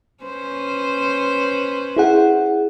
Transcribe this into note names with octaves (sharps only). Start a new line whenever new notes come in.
C#4 B4 C5
E4 G#4 F#5